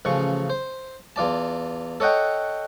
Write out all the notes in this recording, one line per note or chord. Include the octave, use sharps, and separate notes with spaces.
A1 C#3 F3 C#6
C5
E2 F4 D5 A5
A4 C#5 D#5 F#5 G5